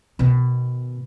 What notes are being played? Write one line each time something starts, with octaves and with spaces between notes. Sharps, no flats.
B2 D#3